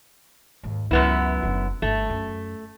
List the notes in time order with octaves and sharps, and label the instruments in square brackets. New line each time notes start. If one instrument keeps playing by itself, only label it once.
[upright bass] D#2 G#2
[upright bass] C#2 F4 [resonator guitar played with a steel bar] F#2 B3 E4
[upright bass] F#1 D3
[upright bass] G1 [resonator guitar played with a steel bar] A3
[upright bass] F#2